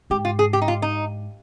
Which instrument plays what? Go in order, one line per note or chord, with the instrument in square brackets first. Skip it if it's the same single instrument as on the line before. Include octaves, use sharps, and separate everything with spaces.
[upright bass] G#2 [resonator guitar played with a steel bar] G4
[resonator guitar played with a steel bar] F4
G#4
G4
D#4
F4
D#4